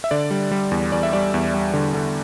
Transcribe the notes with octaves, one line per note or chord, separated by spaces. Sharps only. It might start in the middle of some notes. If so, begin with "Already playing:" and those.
E5
D3 D5
G3
G3
E2
E2 D5
E5
G3 D5
E2
G3
D3
D3